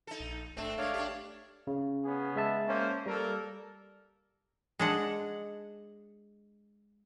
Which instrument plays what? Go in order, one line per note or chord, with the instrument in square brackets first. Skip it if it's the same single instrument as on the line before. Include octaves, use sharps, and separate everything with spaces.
[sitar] D#4 A4
[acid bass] A#1
[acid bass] G#1 [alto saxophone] A3 [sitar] C4 D4
[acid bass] G#3 [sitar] A#3 D4 [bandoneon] C#5 D5 F5
[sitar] D4 G4
[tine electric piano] C#3
[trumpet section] B3 C#4 G#4
[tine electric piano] G#3 E5 A5
[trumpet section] A#3 C#4 C5
[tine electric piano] G3 [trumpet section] A#3 A4 A#4
[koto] G#3 D4 F#5